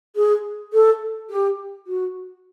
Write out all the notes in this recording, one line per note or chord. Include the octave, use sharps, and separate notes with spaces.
G#4
A4
G4
F#4